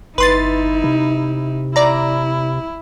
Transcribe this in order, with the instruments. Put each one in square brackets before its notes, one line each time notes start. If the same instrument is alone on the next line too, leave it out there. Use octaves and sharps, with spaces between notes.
[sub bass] G1 [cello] D#4 E4 [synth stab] B4 C6 A6
[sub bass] C3
[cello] E4 [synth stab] D5 A#5